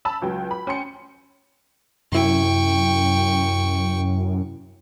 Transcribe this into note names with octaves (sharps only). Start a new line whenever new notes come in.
A5 B5 E6
C#2 F#3 G5
B5
C#4 G5 C6 C#7
F#2 C3 E4 G5 C#6